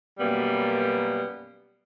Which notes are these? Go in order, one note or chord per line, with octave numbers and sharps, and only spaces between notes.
F#2 B2 G3 A#3 B3